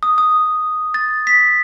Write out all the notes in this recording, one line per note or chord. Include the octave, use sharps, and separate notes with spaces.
D#6
D#6
A6
B6